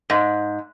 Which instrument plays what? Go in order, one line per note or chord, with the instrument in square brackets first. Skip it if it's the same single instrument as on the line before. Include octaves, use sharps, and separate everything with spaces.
[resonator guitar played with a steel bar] G#2